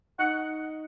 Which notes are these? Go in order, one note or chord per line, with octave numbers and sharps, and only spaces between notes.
D#4 F#5